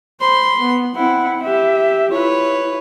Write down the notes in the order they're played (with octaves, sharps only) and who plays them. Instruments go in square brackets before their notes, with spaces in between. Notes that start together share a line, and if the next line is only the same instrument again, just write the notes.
[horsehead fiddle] C5 [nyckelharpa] B5 C6
[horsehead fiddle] B3
[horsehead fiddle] C4 F#5 [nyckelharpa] E4
[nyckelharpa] G4 [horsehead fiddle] E5
[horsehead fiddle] E4 F4 [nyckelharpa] B4 C#5